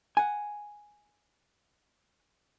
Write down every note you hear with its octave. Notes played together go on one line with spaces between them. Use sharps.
F#5 G#5